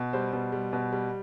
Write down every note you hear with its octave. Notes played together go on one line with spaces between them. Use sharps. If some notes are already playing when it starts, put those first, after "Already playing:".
Already playing: B2
G3 C5
B2
G3
B2
G3